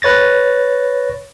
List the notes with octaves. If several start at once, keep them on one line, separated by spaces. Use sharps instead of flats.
B4 C#5 A6 A#6